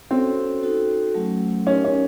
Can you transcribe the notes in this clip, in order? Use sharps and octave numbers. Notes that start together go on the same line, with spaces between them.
C4 C#4 F#4 A4 C#5
D#4 F#4 A4
F#3 A3 C#4
C#4 D#4 G4 A#4
C#4